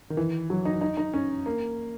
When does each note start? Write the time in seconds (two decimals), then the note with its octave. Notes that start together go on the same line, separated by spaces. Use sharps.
0.10 D#3
0.17 E3
0.50 F#3
0.65 D#4
0.81 D#4
0.97 D#4
1.14 C#4
1.46 A#3